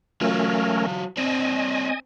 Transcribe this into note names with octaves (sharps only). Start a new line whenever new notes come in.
F#3 A3 C#4 F4 A#4
C4 D4 D#5 G#5